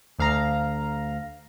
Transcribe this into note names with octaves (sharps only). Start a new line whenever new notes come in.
D2 F5 A#5